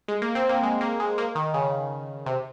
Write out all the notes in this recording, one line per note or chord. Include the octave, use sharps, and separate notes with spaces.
G#3
A#3
C4
A#3
G#3
A#3
G#3
A#3
D#3
C#3
C3